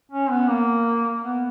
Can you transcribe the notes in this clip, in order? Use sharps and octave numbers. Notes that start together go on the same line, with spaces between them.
C#4
B3
A#3
B3